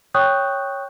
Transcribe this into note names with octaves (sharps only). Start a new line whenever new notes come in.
C#5 G5 C#6 D#6 F#6 G6